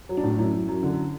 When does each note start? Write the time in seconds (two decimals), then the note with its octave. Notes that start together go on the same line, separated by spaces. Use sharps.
0.09 F#3
0.17 D4
0.24 A2
0.38 F#2 E4
0.54 F#2
0.68 F#2
0.83 D3